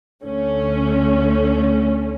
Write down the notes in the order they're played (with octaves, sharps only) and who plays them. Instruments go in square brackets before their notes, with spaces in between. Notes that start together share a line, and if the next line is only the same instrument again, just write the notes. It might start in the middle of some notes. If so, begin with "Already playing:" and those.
[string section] D2 D3 A3 C#4